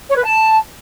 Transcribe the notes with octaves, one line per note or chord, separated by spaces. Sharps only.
C#5
B4
A5